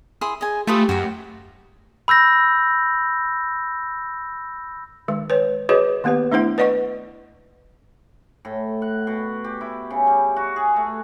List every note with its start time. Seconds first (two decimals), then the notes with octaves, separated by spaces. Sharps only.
0.21 E4 G#4 C6
0.41 G#4 D#5 G#5
0.67 A3 F4 G4 B4 D#6
0.89 F#2 F#4 G5
2.08 B5 E6 G6 A#6
5.08 D#3 G#3
5.30 B4 C#5
5.69 F#4 G#4 B4 C#5 D#5
6.04 D#3 A#3 B3 G4 B4
6.32 A3 D4 E4 C5 F#5
6.58 B4 D5 D#5 F#5 C#6
8.45 A2
8.82 F#5
9.07 B2
9.44 G4
9.61 E4
9.90 C#3
10.07 G3
10.36 F#4
10.56 G#4
10.76 A3